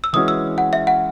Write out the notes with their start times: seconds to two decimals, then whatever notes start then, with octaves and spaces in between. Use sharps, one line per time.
0.04 E6
0.13 E3 G#3 C#4 F#4 D#6
0.28 E6
0.58 F#5
0.73 E5
0.87 F#5